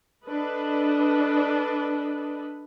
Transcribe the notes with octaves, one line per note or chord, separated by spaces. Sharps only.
D4 A4 B4 D#5